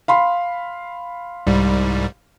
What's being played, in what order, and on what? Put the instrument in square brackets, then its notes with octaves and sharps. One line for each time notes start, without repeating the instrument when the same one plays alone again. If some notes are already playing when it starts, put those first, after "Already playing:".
[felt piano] F5 B5 C6
[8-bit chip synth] C2 G#2 G3